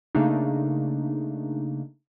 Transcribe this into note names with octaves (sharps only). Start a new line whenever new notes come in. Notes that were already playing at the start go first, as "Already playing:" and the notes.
C#3 A3 A#3 D4 D#4